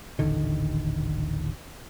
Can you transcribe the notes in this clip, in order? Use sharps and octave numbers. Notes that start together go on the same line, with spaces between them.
D#1 A1 D3 D#3